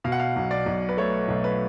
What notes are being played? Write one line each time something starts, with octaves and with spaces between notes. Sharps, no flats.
B2 F5
F#5
F5
B1
D5
B1
B4
A3 C#5
B1
B4